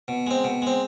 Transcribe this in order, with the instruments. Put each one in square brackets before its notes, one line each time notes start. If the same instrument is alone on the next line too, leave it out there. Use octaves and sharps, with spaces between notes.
[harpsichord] B2
G#3 C4
B2
G#3 C4